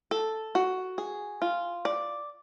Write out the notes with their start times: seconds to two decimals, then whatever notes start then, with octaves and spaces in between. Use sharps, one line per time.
0.11 A4
0.55 F#4
0.98 G#4
1.42 F4
1.85 D5